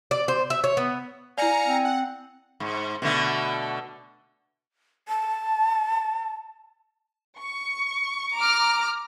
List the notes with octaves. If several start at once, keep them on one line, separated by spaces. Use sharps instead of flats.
D5
C5
E5
C#5
B3
E4 D5 F5 G#5 A#5 C#7
C4
F#5
G#2
B2 D3 A3
A5
C#6
A#5 D6 F6